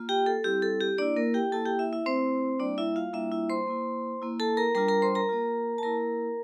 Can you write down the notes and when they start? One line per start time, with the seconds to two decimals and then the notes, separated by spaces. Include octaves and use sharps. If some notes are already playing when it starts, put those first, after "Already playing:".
Already playing: A#3 F4
0.09 G4 G5
0.26 A4
0.44 G3 C4 E4 G4
0.62 A4
0.81 G4
0.98 A#3 D4 E4 D5
1.16 A#3 A#4
1.34 G4 G5
1.52 A#3 E4 A4 A5
1.66 G4 G5
1.79 E4 E5
1.93 E4 E5
2.06 A3 C4 E4 C5
2.60 G3 A#3 D4 E4 D5
2.78 E4 E5
2.96 F4 F5
3.13 G3 A#3 D4 E4 F4 E5
3.32 E4 E5
3.50 C5 C6
3.67 A#3 E4
4.22 A#3 E4
4.40 A4 A5
4.57 A#4 A#5
4.75 G3 D4 F4 A#4 A#5
4.88 A#4 A#5
5.02 C5 C6
5.15 A#4 A#5
5.29 A#3 F4
5.78 A5
5.83 A#3 E4 A#4 A#5